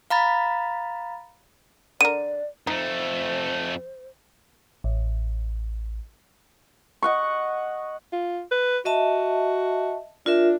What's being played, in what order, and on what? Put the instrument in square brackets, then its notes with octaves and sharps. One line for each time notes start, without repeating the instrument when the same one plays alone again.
[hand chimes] F5 A#5 B5 A6
[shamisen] D3 A#4 [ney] D5 [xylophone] D#7
[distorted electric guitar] F2 A3 [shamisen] D#4 [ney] C5
[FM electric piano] A1
[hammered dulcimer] D#5 F#5 C#6
[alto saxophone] F4
B4
[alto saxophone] F#4 [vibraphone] D#5 E5 A5
[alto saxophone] D4 [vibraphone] F4 A#4 E5